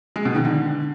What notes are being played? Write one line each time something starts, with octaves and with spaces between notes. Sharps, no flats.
G#3
B2
D#3
D3